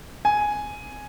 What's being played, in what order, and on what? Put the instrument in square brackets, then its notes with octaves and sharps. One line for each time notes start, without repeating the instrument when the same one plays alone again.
[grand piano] G#5